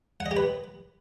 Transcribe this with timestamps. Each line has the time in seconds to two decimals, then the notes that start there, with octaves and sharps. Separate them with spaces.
0.20 F#5
0.26 D#5
0.31 G4
0.37 B4